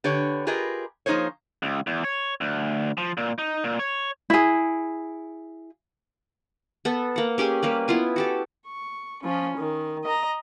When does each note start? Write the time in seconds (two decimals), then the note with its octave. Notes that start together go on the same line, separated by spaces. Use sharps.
0.04 D3 G4 B4 C#5
0.47 F4 G4 G#4 A#4 B4 D#5
1.06 F3 A#3 D#4 G#4 C5 C#5
1.63 C#2
1.87 E2
2.04 C#5
2.41 D2
2.98 F3
3.17 A#2
3.38 D#4
3.64 A#2
3.79 C#5
4.30 E4 G#4
6.85 B3 A4
7.16 A#3 F#5
7.38 C#4 G4 G#4 G#5
7.62 G3 A#3 B4
7.88 B3 E4 F4 G#5
8.16 F#4 G4 A4
8.67 C#6
9.24 F3 C#4
9.57 D#3
10.04 D#5 A#5